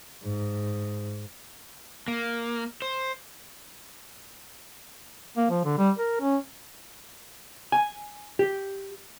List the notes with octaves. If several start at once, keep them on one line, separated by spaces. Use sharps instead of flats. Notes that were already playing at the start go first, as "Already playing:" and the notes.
G#2
A#3
C5
A#3
F3
D3
G3
A#4
C#4
G#5
G4